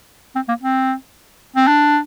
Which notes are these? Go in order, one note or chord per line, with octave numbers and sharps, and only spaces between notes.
C4
A#3
C4
C4
D4